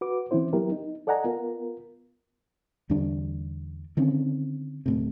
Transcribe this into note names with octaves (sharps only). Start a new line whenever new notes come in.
F#4 B4 D6
E3 C4 C#4 E4 C5
F#3 B3 E4 G4 A#4
D#4
A4 D5 D#5 F#5 G#5 A#5
B3 F4 A#4
E2 D3 G3 D4
D3 D#3 C4 C#4
D1 A2 C3